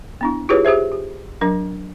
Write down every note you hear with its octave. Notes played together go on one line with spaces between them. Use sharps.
B3 D4 E4
E4 F4 G4 G#4 B4 C#5
G4 G#4 C5 E5
G4
F#3 D4 A#4